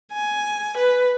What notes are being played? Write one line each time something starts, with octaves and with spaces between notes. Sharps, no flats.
G#5
B4